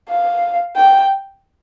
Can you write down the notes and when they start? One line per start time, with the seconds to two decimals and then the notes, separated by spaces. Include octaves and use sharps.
0.10 F5
0.76 G5